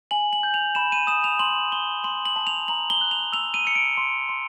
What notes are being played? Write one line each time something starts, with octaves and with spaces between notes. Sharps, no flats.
G#5 F#7
F#7
G6
F7
B5 E7
D#7
D#6 E7
F7
C6 F#7
C6 G7
C6 F#7
F#7
A5
F7
A#5 F#7
G7
F#6
F7
E6 F7
D#7
E6 C#7
D7
C6
C6